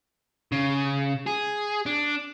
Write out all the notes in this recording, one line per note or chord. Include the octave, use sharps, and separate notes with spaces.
C#3
G#4
D4